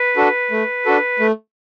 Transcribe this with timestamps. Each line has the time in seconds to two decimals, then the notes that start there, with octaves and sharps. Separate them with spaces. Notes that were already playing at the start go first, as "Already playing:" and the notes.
Already playing: B4
0.16 D4 F#4 A4
0.51 A3
0.86 D4 F#4 A4
1.20 A3